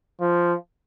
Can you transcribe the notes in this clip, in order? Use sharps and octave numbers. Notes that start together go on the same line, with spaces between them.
F3